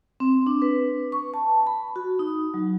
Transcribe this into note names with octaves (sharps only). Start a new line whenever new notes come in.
C4
D4
B4
C#6
A5
B5
F#4
D#4
F#3